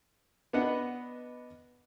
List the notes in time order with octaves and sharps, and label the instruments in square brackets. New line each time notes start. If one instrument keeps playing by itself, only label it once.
[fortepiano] B3 D4 B4 D#5 F#5